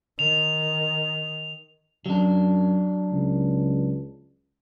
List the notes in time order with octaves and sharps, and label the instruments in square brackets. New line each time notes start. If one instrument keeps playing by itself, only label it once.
[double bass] D#3 [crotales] F7
[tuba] F#2 [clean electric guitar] F#3 D4
[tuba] C#2